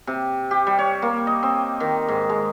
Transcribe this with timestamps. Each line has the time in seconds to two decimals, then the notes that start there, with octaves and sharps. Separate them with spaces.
0.07 C3
0.51 G4
0.67 G3
0.79 C#5
1.02 A#3
1.27 D#5
1.43 C4
1.80 D#3
2.08 G#2
2.29 G#3